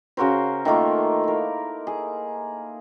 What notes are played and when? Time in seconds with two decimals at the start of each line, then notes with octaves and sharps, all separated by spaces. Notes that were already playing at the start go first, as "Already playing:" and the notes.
0.17 C#3 F#4 A#4 C5
0.65 D#3 A3 A#3 F4
1.24 E4 A#4
1.87 G#4